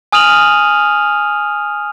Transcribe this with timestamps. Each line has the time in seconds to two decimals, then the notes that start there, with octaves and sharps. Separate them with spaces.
0.12 G#5 D#6 F6 D#7 F7 F#7